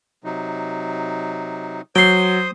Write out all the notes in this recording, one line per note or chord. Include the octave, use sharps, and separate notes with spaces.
C3 F#3 D#4
F#3 C5 G5 C6 D#6